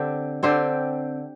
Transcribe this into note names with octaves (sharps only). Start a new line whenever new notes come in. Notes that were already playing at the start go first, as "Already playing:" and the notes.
Already playing: D3 C4 G4 C5
D3 C4 G4 C5